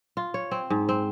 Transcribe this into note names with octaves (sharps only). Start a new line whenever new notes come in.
F4
C#5
C4
G#2
C4